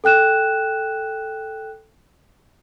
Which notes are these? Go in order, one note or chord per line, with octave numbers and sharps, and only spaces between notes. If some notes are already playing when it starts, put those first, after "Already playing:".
A4 G5 F#6 E7